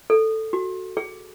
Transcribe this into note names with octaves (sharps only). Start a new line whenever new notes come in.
A4
F#4
G#4